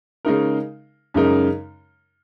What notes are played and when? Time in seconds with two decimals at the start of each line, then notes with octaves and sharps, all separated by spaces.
0.25 C#3 G#3 D#4 A#4
1.14 F#2 C#3 G#3 D#4 A#4